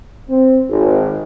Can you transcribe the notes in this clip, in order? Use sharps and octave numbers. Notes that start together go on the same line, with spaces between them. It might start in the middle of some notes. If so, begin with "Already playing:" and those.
C4
G#1